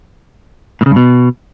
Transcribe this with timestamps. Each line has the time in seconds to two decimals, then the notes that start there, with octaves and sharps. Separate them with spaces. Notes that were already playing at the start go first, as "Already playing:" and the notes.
0.81 A2
0.86 C#3
0.91 G2
0.96 B2